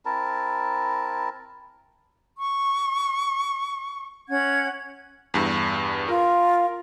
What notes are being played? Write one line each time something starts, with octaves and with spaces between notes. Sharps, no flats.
C4 E4 A#4 A5
C#6
C#4 F#5 G#6
E2 G2
F4 A#4